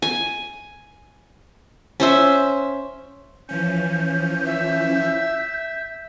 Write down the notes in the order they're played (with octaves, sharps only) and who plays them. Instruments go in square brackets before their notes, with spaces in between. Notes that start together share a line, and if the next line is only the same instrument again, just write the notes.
[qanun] G#5
C#4 C5 E5
[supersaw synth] E3 F3 C#4 [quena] G6
[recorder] E5